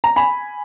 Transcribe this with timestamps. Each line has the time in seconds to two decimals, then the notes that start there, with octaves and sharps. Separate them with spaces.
0.04 A#5
0.16 G#5 B5